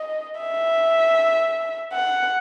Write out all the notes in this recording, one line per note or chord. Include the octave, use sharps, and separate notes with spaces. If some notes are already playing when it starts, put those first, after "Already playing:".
Already playing: D#5
E5
F#5